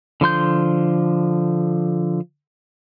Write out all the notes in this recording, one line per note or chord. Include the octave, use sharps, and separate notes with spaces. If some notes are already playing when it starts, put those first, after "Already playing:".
D3 F3 C6 G6